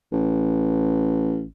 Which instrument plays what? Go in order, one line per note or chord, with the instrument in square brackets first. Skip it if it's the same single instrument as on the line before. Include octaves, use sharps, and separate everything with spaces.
[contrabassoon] A1